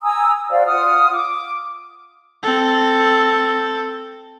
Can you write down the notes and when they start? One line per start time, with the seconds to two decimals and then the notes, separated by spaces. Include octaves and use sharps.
0.02 G#5 A#5 D#6 E6
0.50 F#4 C5 D5 F5
0.66 F4 F#5 D#6 F6
1.13 D6
2.43 C4 A4